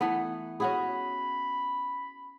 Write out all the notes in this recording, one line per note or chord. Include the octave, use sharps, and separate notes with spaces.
E3 A3 B3
C#4 F#4 G#4 B5